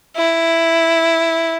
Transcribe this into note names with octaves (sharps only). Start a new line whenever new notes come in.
E4